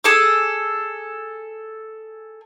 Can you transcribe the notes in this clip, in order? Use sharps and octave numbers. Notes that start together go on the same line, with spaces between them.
G#4 A4 D6